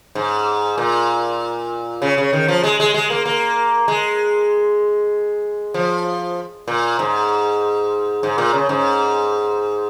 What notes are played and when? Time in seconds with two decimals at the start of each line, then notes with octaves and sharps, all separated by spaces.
0.15 G#2
0.78 A#2
2.02 C#3
2.18 C#3
2.33 D#3
2.48 F3
2.64 G#3
2.80 G#3
2.94 G#3
3.10 A#3
3.26 A#3
3.88 G#3
5.74 F3
6.68 A#2
6.99 G#2
8.23 G#2
8.38 A#2
8.53 C#3
8.69 G#2